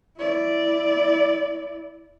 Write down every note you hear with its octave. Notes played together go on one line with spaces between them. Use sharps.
E4 D5